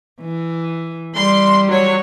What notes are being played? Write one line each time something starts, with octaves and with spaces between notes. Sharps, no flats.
E3
G3 C6
F#3 C#5